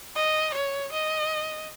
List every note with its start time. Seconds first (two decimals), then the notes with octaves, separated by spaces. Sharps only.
0.16 D#5
0.54 C#5
0.92 D#5